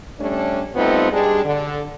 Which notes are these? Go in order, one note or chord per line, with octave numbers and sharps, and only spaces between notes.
G3 A3 C#4 D4
G3 A3 B3 C4 D#4 F4
G3 G#3 D4
D3